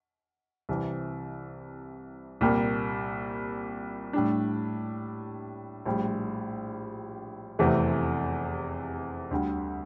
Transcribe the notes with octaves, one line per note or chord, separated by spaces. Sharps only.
C2 C3 E3
C2 A#2 G3 A#3
A2 G3 D4
A#1 A2 G3
F1 E2 C3 E3 A3
D2 D3 G3